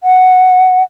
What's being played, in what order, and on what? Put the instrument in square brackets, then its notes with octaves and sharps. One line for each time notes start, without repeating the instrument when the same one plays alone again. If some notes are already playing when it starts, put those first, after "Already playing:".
[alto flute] F#5